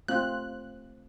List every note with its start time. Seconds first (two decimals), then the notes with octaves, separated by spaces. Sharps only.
0.08 A3 C4 F4 F#6